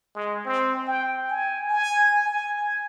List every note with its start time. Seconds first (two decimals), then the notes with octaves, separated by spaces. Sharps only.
0.15 G#3
0.45 C4
0.87 G5
1.30 G#5
1.69 G#5
2.25 G#5